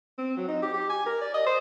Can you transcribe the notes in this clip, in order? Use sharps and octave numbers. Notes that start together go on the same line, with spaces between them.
C4
F#3
D#4
G4
G4
G#5
A#4
D5
D#5
C5